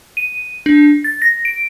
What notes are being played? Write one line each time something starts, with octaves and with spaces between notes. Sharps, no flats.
D#7
D4
A6
A#6
D7